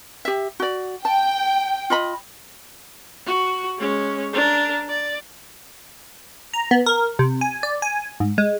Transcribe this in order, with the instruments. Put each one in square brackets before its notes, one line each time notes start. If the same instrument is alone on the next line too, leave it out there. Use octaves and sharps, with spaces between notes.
[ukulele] G4 E5
F#4 D5
[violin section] G5 [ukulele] A5
[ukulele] F4 D#5 B5
[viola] F#4
G#3 C#4
D4 A#4
D5
[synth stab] A#5
B3
A#4
C3
G#5
D5
G#5
G#2
G#3